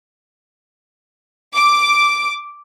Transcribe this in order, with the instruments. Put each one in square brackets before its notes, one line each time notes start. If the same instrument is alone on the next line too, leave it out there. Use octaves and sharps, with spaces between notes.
[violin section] D6